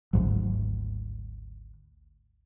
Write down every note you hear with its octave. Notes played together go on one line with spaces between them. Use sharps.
G#1 D2 G#2 F#3